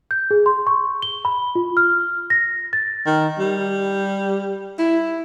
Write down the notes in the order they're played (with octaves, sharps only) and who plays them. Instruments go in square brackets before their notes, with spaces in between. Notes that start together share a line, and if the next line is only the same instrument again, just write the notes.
[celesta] G6
G#4
C6
C#6
G7
B5
F4
F6
A#6
A6
[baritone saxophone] D#3
G3
E4